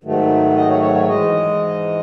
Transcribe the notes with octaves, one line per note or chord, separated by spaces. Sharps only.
G#2 D#3 F#3 A3
D#5
C#5
C#5
C#5
G#2 E3 G#3 D#5